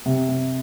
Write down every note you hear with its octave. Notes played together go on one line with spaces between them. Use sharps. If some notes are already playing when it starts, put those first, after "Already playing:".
C3
C3